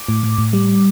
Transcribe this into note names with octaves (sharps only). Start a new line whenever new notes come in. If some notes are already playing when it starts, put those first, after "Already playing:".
Already playing: D6
A2
A2
A2
G3